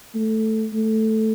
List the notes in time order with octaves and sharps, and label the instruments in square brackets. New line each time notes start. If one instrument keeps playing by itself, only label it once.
[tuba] A3
A3